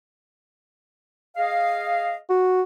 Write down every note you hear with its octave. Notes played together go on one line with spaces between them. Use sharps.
G#4 D#5 F5
F#4